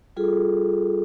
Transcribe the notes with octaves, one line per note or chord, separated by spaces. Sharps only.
G3 F4 G#4 A4